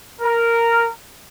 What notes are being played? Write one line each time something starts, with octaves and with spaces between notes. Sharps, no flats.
A#4